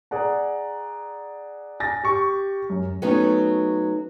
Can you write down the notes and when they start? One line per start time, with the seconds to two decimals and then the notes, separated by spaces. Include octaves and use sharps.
0.11 G#4 D5 F#5 A#5
1.80 G#5 A6 A#6
2.04 G4 C#6
2.70 F#2
3.02 F#3 A3 B3 C#4 D#4